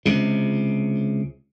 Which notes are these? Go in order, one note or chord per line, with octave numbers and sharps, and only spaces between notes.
C#2 C3